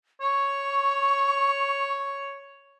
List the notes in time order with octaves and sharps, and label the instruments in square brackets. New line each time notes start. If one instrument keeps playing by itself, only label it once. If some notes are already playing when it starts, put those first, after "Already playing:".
[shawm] C#5 [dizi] C#6